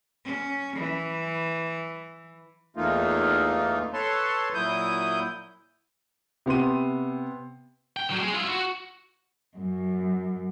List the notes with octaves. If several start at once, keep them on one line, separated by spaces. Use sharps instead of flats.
C#4
E3
E2 E3 A3 A#3 D#4 F4
A4 B4 C#5 A5 C6
A#2 F#3 E4 D#6 G6
C3 B3 C6 D#7
G5
D3 F#3
G#3
E4 F4
F#4
F#2